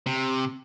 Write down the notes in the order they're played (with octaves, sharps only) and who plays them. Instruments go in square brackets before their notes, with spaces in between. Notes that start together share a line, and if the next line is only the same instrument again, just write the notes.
[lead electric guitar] C3